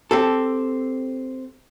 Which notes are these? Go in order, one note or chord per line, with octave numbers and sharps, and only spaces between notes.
C4 G4 A4